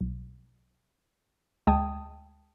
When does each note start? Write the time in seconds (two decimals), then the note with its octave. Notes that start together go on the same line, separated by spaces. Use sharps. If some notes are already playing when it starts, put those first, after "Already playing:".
0.01 B1
1.67 D2 G#3 G5 A5 D#6 G#6